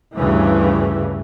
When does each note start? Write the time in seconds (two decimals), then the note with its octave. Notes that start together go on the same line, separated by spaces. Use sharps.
0.18 D2 G2 C#3 E3